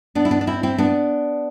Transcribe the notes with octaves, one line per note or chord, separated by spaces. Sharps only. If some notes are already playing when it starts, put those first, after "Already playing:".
B3 D4
E4
B3 D4
D4
C4 E4
C4 E4
B3 D4